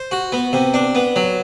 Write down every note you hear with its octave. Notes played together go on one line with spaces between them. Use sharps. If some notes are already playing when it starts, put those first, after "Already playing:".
Already playing: C5
F#4
B3
C3
D4
B3
F#3